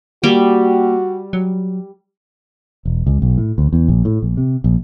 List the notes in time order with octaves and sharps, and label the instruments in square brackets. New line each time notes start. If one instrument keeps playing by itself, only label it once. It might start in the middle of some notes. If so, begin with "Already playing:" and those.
[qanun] G3 [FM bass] A#3 [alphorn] F#4
[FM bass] F#3
[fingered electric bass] E1
C#2
B1
A2
D2
E2
A#1
A2
A#1
C3
A#1